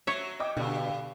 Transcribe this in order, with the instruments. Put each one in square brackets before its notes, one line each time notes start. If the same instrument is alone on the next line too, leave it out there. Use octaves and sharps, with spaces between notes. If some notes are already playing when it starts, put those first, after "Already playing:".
[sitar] F#3 [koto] C#5 E5
[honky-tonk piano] D#5 G5 D6
[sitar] G2 [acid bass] B2 [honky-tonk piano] D3